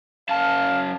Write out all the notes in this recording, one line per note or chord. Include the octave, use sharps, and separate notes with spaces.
F#2 F5 A5